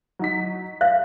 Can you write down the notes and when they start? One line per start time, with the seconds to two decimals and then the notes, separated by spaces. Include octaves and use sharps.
0.19 F#3 D#4 B6
0.81 E5 F5 F#6